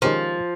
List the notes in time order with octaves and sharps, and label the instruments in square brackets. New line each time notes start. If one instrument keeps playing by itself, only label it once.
[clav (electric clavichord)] D#3 G#3 C#4 G4 A#4 [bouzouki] F3